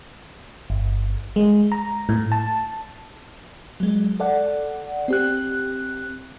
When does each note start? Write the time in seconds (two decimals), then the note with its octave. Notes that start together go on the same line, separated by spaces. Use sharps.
0.70 G1
1.36 G#3
1.72 A#5
2.09 A2
2.32 A5
3.80 F#3 G#3
4.20 A4 D5 F#5
5.08 C4 G4 F#6